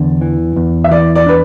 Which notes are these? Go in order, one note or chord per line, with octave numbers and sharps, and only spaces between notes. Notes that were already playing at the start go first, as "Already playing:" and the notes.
Already playing: E2 D3
E3
E2
E5
E3 D5
D5
D4 B4